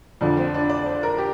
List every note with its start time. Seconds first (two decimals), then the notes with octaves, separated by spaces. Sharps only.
0.21 F2 D3 F3 D4
0.37 C4
0.54 D4
0.69 D5
0.86 C5
1.03 A#4
1.18 G4